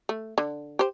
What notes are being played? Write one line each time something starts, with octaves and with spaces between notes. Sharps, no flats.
A3
D3
G4 C5